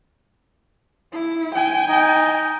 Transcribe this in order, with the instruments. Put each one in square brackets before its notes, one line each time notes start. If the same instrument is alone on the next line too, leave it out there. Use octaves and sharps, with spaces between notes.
[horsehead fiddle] E4
G5 G#5
[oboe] D#4